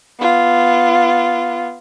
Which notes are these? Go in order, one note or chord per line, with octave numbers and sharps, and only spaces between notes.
B3 F4